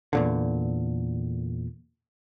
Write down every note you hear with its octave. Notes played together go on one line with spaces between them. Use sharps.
E2 A#2 D3